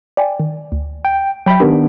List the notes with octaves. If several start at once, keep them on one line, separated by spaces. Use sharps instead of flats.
D5 G5 G#5
D#3
D2
G5
F#3 E5 G5 B5
D#3 B3 D4 G4 A#4